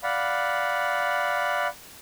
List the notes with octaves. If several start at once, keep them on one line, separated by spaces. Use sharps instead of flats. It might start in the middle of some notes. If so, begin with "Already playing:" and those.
D5 F5 F#5 B5